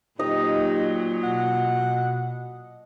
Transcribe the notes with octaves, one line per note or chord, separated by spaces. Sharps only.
A#2 F#3 D#4 G4 D#5
B2 F#5